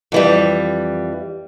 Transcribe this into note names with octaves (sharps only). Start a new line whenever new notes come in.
F2 E3 G3